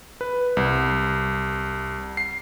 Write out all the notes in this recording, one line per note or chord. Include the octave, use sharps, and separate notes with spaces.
B4
C2
C7